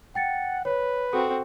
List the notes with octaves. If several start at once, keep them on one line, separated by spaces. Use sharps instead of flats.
F#5 G5 A6 C#7
B4 C#5
C4 F#4 A4